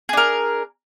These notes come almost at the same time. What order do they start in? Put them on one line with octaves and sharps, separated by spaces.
G#4 D4 A#4